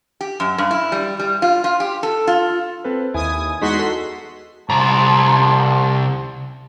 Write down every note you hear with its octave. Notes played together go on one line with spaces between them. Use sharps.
G4
F#2
G2
E4
G3
G3
F4
F4
G4
A4
F4
C4 A4 B4
D#2 E4 G#5 D#6
E2 G#3 D#4 F#4 C6 B6
A4
C2 C5 A5 A#5